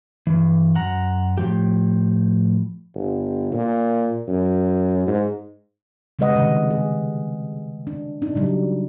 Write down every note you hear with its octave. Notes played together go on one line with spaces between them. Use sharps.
G2 E3
F#2 F#5 A#5
A2 F3 G4
G1
A#2
F#2
G#2
C#3 G3 G#3 B4 D#5 F#5
C3 D#3 G#3
G#4
D4
D4 D#4
C#3 F#3 G3